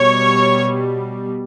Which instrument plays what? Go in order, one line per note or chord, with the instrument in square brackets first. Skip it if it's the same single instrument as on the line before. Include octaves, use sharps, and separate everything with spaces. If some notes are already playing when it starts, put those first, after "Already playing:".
Already playing: [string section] B2 G3 C#5